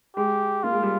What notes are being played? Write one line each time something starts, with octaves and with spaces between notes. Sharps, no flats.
G#3 G4
A#3 F4
G#3
G3